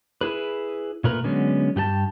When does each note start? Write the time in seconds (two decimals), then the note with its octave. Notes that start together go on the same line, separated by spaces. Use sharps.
0.21 E4 G#4 B4
1.04 A#2 A3 A#4 B4
1.24 D3 F#3 G#3 B3 C#4
1.76 G2 G4 G#4 A5